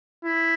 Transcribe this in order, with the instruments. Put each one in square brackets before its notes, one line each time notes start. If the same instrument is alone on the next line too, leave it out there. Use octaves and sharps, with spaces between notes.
[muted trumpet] E4